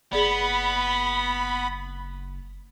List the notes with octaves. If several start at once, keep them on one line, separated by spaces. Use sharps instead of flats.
F#1 B3 G#4 D5 B5